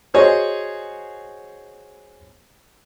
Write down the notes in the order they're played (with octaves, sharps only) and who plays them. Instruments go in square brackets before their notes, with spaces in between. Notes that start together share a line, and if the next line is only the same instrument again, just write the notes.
[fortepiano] F#4 G#4 C5 C#5 D#5